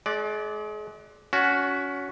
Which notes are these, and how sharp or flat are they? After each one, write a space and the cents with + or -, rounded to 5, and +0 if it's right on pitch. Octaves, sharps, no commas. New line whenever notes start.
G#3 +35 D5 +0
C#4 +25 F#4 +0